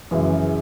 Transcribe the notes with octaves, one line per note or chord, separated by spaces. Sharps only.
F#2 C#3 E3 G#3